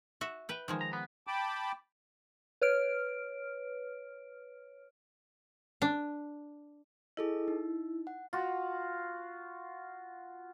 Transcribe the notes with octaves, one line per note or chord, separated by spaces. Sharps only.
F#4 E5
B4 G5
D#3 F3 G#3
A#5
B3
G5 A5 B5 D6
B4 C#5 F6 D7
D4
E4 G#4 A4 D#5
D#4
F#5
F4 F#4